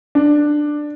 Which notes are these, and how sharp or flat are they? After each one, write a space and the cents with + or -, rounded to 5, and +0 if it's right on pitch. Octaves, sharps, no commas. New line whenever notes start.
D4 +10